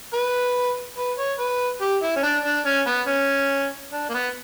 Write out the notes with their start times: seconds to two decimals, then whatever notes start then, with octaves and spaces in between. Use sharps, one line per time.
0.13 B4
0.97 B4
1.18 C#5
1.39 B4
1.81 G4
2.02 E4
2.16 C#4
2.23 D4
2.44 D4
2.66 C#4
2.86 B3
3.07 C#4
3.92 D4
4.09 A#3
4.14 B3